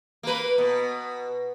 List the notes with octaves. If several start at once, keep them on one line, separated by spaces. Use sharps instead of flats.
A#3 B4
B2